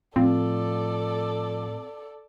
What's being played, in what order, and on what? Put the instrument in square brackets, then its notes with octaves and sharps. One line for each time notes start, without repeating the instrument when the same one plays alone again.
[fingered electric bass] A2 [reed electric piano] F3 F4 [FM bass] C4 [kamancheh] A4 D5